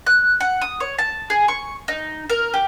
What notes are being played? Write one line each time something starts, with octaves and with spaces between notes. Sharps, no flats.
F#6
F#5
D#6
C#5
A5
G#4
C#6
D#4
A#4
G4